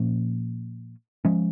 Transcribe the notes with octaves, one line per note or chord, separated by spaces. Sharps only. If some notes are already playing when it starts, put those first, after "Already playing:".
Already playing: A#2 F3 A#3 C#4
F3 G#3 C#4